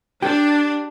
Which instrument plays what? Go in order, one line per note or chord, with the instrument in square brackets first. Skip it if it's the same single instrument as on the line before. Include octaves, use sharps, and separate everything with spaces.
[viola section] D4 [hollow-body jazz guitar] G4